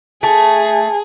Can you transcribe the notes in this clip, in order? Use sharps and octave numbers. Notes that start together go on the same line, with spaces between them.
A3 G#4